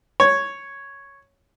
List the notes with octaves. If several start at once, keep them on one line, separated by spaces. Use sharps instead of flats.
C#5